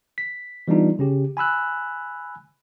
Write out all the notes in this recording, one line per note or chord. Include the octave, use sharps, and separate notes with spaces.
B6
E3 G3 B3 D4 D#4 F4
C#3 C#4 G4
G#5 B5 E6 F#6